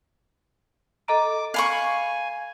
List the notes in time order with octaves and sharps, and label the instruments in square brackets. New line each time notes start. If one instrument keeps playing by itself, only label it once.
[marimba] A4 D#5 A#5 [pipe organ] D6
[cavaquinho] F5 B5 C#6 [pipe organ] G#5